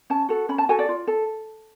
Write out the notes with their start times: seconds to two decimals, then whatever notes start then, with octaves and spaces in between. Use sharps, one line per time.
0.10 C#4 A5
0.29 F#4 A4
0.49 C#4 B5
0.58 A5
0.69 F#4 A4 G#5
0.79 D5
0.89 F4
1.07 A4